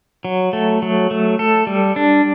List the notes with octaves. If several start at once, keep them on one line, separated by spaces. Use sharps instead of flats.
F#3
A3
F#3
A3
A4
G3
D4